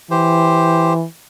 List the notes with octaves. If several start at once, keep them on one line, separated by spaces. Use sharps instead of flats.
E3 G4 C5